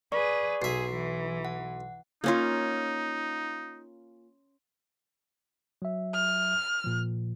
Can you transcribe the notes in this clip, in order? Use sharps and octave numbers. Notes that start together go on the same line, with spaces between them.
G#4 B4 D5 C#6
B1 G#4 E5 C7
E3
F#5
A#3 C#4 D#4 F4
F#3 E5
F6
A#2 F3